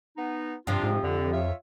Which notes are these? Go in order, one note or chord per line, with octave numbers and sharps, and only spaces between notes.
B3 D#4
G2 C3 F3 D4 F4
G#2
F2 D3
F4 C#5 E5